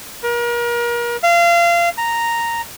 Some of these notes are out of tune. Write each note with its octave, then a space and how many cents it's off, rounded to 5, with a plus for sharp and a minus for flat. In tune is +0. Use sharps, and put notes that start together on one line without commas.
A#4 +35
F5 -25
A#5 -5